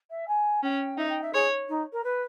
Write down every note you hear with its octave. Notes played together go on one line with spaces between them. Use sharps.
E5
G#5
C#4 G5
D#4 E5
G5
E5
G#4 C#5
D#4
A#4
B4